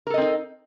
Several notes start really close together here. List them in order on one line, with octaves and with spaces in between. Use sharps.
A#4 A4 D#5 C4 D#4